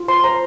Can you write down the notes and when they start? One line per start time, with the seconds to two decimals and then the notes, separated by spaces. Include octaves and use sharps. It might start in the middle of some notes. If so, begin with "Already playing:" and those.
Already playing: F4
0.08 C5 C6
0.24 C5 A#5